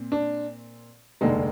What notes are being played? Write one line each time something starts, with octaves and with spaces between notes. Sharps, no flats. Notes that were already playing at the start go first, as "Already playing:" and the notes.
Already playing: A#2 C4
D4
F1 D#2 D3 G#3 D#4